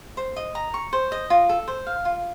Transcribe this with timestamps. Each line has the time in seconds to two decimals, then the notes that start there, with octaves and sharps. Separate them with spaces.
0.17 C5
0.36 D#5
0.55 A#5
0.74 C#6
0.93 C5
1.12 D#5
1.30 F4
1.49 A4
1.68 C5
1.86 F5
2.05 F4